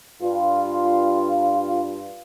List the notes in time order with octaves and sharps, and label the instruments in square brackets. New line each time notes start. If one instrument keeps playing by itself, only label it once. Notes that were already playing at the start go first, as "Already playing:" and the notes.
[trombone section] G2 F4